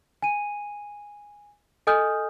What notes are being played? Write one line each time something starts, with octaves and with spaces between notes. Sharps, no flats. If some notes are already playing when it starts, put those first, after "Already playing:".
G#5 D#7
A4 D#5 G#5 D#6 F6 G6